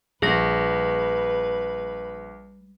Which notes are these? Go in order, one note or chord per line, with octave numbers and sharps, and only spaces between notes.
A#1 G3 G#4 B4 A#6